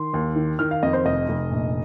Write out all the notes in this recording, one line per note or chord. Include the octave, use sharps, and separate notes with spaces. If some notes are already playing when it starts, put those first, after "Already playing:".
Already playing: D#3 C6
D#2
D#3
D#3 F6
F5
F2 D#5
C5
F1 D#5
F1
A#1